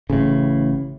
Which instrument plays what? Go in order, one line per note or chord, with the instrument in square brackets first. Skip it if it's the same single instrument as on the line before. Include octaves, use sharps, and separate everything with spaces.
[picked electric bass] A1 A2 [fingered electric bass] C#3